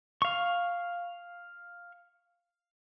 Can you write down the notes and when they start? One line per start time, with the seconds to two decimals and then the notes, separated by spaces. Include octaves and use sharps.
0.22 F5 C#6